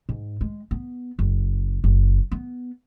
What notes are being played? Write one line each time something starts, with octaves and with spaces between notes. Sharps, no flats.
G#2
G#3
B3
F#1
F#1
B3